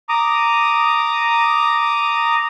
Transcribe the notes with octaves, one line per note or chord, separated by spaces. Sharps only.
A#5 D6 D#6